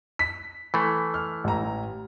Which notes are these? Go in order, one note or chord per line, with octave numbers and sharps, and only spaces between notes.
B6
E3 A3
F6
A1 A#5